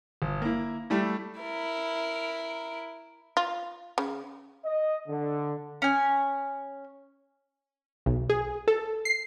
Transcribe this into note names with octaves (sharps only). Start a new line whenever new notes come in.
G1
A#3 E4
G3 A3 E4
E4 A#4
F4
C#3
D#5
D3
C#4 G#5
B1
G#4
A4
C7